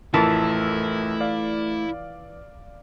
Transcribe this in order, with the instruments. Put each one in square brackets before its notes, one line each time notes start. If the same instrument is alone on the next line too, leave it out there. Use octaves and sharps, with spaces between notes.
[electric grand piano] A1 F2 A#4 [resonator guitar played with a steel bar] E3 F4 A5 [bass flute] A3 [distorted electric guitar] E4
[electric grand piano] D5 F5